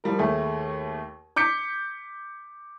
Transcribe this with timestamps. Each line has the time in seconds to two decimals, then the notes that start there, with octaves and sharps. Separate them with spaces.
0.04 F3 G3 A#4
0.19 D#2 A3 G#4
1.36 D6 G6 B6 C#7